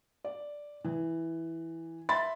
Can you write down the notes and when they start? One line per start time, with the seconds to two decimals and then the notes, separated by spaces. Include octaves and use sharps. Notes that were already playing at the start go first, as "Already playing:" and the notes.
0.25 D5
0.85 E3
2.09 E5 B5 C6 A6